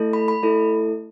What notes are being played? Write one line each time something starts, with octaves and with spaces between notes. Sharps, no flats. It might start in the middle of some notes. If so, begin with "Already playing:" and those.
Already playing: A3 E4 A4
B5
B5
A3 E4 A4